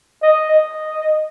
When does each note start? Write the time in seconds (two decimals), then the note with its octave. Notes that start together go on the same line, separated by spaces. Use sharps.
0.23 D#5
0.52 D#5